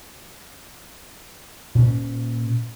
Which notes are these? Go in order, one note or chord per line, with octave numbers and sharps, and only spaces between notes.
A#2 C#4